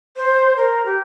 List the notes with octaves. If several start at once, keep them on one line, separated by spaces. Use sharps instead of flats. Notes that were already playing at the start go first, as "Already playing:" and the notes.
C5
A#4
G4